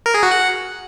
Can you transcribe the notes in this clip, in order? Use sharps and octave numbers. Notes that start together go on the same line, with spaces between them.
A#4
G#4
F#4
F#5